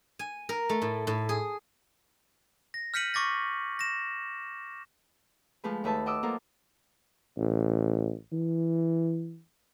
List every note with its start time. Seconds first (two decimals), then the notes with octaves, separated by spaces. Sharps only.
0.19 G#5
0.49 A#4
0.69 A3
0.82 A2
1.07 A2
1.29 G#4
2.74 A#6
2.94 F6 G6 B6 C#7 D#7 F#7
3.14 C#6 D6 A6 A#6
3.79 A#6 E7
5.64 F3 G#3 A3 B4
5.84 D#2 A3 B4 E5 A5
6.06 F#4 D#5 D6 E6
6.23 F#3 A#3 F4 A4 A#4 C5
7.37 A1
8.33 E3